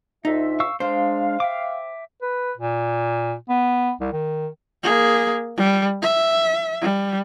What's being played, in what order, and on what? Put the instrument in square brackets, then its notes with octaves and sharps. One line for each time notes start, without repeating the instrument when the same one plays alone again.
[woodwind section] D2 F4 E5 [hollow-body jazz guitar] D#4
[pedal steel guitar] F5 C#6 E6
[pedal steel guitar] G#3 D4 [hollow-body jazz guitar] C5 [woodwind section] F5
[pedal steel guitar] E5 G5 D6
[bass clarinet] B4
A#2
B3
C2
D#3
[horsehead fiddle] A#3 G#4
G3
E5
G3